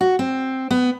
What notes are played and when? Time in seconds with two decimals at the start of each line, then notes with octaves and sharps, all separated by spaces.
0.01 F#4
0.19 C4
0.71 B3